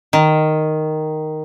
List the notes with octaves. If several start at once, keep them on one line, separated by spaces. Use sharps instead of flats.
D#3